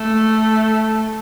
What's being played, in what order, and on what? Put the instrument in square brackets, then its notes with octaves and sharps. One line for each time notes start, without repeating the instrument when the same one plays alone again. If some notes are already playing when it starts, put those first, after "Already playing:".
Already playing: [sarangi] A3